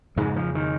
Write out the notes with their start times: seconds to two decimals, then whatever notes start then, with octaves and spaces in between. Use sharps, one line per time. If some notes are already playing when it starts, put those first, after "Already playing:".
0.16 F2 G#2 C#3 G#3
0.36 F3
0.55 D#3